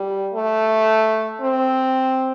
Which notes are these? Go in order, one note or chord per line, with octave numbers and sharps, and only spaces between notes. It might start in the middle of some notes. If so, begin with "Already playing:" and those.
Already playing: G3
A3
C4